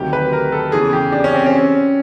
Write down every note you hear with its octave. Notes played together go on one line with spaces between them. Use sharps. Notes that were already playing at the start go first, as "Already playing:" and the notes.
Already playing: D2 C3 D#3 F#3 G4
B4
A#4
A4
E2 C#3 E3 G#4
G4
D4
C#4
C4
C#4